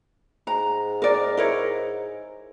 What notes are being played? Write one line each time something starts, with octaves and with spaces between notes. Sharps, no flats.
G#2 A#5
A#4 D5
E4 A#4 C#5